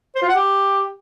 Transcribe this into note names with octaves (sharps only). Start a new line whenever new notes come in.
C5
F4
F#5
G4